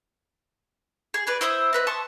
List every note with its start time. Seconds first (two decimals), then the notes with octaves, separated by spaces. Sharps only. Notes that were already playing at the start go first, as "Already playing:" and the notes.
1.14 G#4
1.27 G#4 B4 D5
1.41 E4 C5 E5 D#6
1.73 C4 B4 D#5
1.87 A5 C6 C#6 D#6